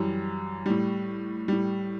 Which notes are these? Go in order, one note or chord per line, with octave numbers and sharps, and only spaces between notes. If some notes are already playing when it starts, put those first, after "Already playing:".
Already playing: F#2 E3 G3
A2 G3
A2 G3